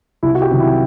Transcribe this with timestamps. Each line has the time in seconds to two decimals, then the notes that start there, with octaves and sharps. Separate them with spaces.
0.23 C2 E4
0.35 F#4
0.42 G4
0.51 C3 D#3 F#3
0.60 E4